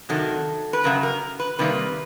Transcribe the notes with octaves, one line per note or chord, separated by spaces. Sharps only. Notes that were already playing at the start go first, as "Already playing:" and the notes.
C3 D#3 F#3 A4
B4
F#2 C#3 A#4
A#4
B4
C3 D#3 G3 A#3 B4